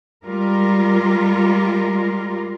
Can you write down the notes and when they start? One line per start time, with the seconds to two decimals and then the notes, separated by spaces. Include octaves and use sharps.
0.25 G3 G#3 F4 A#4